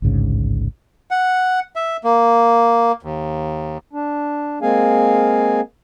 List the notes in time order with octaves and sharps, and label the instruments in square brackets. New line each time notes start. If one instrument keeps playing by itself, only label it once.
[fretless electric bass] A1 D2 G#2 C#3
[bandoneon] F#5
E5
A#3
D#2
[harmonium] D4
G#3 A#3 C4 G#4 F5 G#5